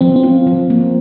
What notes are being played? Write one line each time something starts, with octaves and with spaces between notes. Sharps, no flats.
F3 C4
C4
F4
F3
A#3